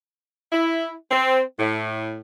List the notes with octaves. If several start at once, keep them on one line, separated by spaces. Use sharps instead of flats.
E4
C4
A2